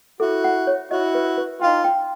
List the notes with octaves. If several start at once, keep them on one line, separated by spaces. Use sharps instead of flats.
E4 F#4 A4
F#5
C#5
E4 F#4 D#5
B4
B4
D#4 F4 G5
G5